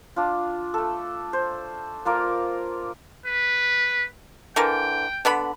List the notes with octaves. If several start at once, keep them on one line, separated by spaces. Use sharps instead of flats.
D4 F4
A3 A4
C5
A#3 F4 A#4 D5
B4
D3 E3 A#4 G5
D3 B3 B5